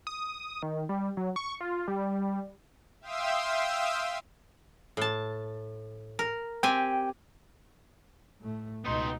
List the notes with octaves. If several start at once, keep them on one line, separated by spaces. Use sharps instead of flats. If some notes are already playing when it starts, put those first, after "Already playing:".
D#6
D#3
G3
F#3
C#6
F4
G3
E5 F5 G5 C6 D#6 E6
A2 A5
A#4
C4 G4 G5 G#5
A2 A3
C#2 B2 B3 D#4 C6